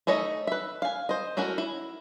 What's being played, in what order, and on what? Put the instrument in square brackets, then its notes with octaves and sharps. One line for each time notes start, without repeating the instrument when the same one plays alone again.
[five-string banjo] A3 D#4 C#5 D#5 E5
B4 E5
F5 G#5
C5 D#5
A3 C#4 E4 F#4 A#4
E4